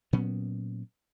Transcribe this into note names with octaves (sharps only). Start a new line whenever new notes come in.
A#2 F#3 B3 C#4